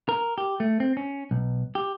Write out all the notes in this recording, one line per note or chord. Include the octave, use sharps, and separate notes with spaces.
A#4
G4
A3
C4
C#4
B1
G4